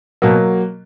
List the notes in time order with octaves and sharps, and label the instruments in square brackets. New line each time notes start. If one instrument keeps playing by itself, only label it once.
[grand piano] B2 [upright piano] F#3 A#3